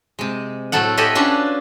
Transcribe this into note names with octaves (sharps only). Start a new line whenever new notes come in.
C3 G#3
A2 F#3 C4 A4 F#5
G4 A4 D#5 E5 F#5 G#5
C#4 D4 F4 F#4 B4